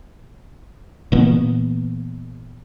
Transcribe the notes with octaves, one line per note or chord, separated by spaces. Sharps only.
A#2 E3 A#3 B3